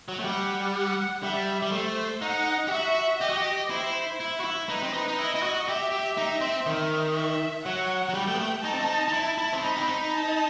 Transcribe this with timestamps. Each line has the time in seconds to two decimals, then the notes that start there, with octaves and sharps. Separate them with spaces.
0.08 F#3
0.20 A3
0.24 G3 F#5
0.74 F#5
1.23 G3 E5
1.62 G3
1.72 A3 C5
2.22 D#4 F#5
2.68 G4
2.72 F#4 E5
3.21 G4 D#5
3.29 F#4
3.37 G4
3.70 E4 C5
4.20 E4
4.40 F#4
4.45 E4
4.69 D#4 B4
4.83 C4
4.93 D#4
5.08 D#4
5.18 E4 D#5
5.35 E4
5.43 F#4
5.68 G4 E5
5.92 G4
6.17 D#4
6.41 C4
6.66 D#3
7.15 E5
7.65 F#3 F#5
8.09 F#3
8.14 G3 G5
8.27 A3
8.34 B3
8.39 A3
8.64 D#4 A5
8.73 C4
8.80 D#4
9.08 D#4
9.13 E4
9.38 E4
9.53 C4
9.63 D#4 B5
9.77 C4
9.87 D#4
10.12 A5